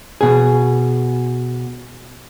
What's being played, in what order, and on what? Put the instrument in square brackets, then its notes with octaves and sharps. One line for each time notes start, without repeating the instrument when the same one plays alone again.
[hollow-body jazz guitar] B2 G#4